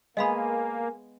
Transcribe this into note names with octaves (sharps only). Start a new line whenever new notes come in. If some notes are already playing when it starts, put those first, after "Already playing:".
G#3 A#3 B3 G#4 D#5 F5 G#5 B5